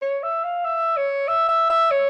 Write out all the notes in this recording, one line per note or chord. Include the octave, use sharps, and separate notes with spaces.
C#5
E5
F5
E5
C#5
E5
E5
E5
C#5